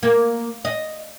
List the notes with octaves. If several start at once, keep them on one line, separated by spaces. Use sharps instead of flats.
A#3
D#5